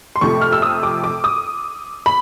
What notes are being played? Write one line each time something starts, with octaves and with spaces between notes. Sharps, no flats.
C6
F2 C3 F3 A3 C#6
F6
E6
D#6
D6
D6
D#6
B5